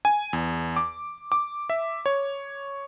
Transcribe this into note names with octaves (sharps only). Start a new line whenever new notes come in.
G#5
E2
D6
D6
E5
C#5